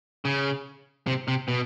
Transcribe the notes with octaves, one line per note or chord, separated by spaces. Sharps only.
C#3
C3
C3
B2